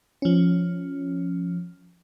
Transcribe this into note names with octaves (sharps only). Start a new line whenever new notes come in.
F3 C#4